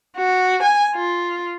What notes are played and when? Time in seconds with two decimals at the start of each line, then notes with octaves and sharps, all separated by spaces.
0.16 F#4
0.62 G#5
0.95 F4